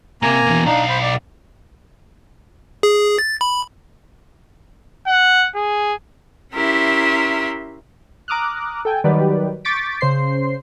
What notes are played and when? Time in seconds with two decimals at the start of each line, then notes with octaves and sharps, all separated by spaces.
0.22 C3 A#3 G#5 A#5
0.46 B2 E3
0.66 B1 D4 D#4 F5
0.89 C5 B5
1.02 D5
2.83 G#4
3.19 A6
3.41 B5
5.07 F#5
5.55 G#4
6.53 C#4 E4 G4 A#4 E5 C6
8.28 A#5 D6 D#6 F6 F#6
8.85 A4 G5 G#5
9.04 D#3 F#3 G3 G4 B4 D5
9.65 C#6 D6 G6 A6 B6 D7
10.01 C#3 C5 C6 C7